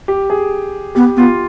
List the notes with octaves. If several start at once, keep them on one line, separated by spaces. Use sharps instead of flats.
G4
G#4
B3 G4
B3 F4